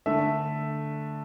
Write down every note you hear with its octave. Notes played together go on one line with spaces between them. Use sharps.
D3 A3 E5